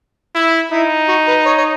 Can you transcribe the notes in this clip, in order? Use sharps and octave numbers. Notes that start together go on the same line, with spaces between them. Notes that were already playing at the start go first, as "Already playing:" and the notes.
E4
D#4 E4
F#4
B4
C#5
C#5